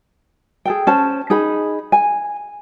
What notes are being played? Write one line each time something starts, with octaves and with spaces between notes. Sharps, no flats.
G#4 A4 G5
C#4 C5 A5
D#4 G#4 B5
G#5